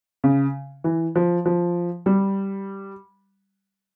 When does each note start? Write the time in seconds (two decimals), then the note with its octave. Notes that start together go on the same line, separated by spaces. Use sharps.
0.24 C#3
0.84 E3
1.16 F3
1.46 F3
2.06 G3